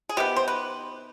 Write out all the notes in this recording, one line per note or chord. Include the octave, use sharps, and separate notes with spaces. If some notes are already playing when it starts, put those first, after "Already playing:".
G#4
C3 D#3 B3 G4
C5
B4